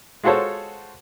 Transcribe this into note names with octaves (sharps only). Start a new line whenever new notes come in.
G#3 F4 F#4 A4 C5 C#5